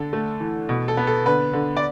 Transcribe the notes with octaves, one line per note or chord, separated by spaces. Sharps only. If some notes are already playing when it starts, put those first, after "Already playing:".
Already playing: D3 A4
A3
E3
B2
A4
B3
A4
D3 B4
D3
D5